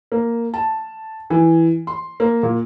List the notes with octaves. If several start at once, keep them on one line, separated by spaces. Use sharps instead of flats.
A#3
A5
E3
C6
A#3
A#2